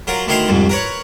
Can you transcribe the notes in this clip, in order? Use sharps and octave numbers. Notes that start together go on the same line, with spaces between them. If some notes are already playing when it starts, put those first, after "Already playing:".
F#3 F4 A#4
D2 D#3 E4 D#5 F5 C6
C2 F2 G#2
A#4 B4 C#5